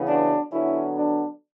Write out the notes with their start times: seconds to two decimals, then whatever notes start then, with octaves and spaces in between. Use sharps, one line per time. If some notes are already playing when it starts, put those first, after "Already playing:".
Already playing: C#3 E3 B3
0.08 D4 F#4
0.52 D3 F#3 B3 C#4 E4
0.96 D4